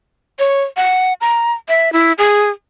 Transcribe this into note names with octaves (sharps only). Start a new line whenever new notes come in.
C#5
F#5
A#5
E5
E4
G#4